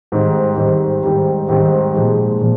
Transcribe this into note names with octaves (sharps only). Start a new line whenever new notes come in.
G#2 D#3 G3 C4 D#4
G#2 D#3 G3 C4 D#4
G#2 D#3 G3 C4 D#4
G#2 D#3 G3 C4 D#4
A#2 F3 G#3 D#4
A#2 F3